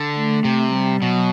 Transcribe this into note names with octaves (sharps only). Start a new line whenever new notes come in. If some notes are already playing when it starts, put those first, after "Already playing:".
Already playing: D3
A3
C3
G3
B2 F#3